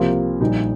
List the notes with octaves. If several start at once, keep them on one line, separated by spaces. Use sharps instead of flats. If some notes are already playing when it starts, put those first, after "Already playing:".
Already playing: C2 C3 F3 A#3 F4
A#1 A#2 G3 D#4